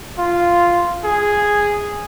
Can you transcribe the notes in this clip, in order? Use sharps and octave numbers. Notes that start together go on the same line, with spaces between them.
F4
G#4